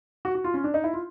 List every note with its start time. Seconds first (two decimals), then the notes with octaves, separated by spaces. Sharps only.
0.25 F#4
0.35 F#4
0.44 F4
0.54 C#4
0.64 D4
0.74 D#4
0.84 E4
0.94 F4